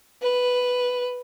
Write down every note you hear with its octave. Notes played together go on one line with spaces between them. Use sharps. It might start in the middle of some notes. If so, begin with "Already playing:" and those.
B4